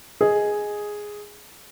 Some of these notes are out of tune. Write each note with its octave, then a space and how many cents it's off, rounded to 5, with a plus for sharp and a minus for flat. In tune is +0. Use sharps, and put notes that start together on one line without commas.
G#4 +0 D#5 +5